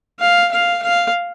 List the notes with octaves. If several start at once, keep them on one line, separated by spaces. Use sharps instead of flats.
F5
F5
F5